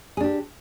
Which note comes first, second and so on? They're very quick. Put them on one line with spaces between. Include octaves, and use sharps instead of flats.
G#4 D4 G4